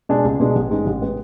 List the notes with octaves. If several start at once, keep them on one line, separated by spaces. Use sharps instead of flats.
B2 G#3 D4 G#4
C#2
B2 G#3 D4 G#4
A1
G#2 G#3 B3
A1
G#3 B3